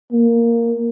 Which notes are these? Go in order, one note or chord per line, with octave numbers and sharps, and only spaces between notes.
A#3